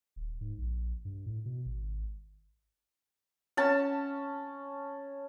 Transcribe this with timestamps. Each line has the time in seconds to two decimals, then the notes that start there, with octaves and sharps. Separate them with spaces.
0.16 D#1
0.41 G#2
0.58 A#1
1.05 G2
1.26 A2
1.46 B2
1.66 G#1
3.57 C#4 A5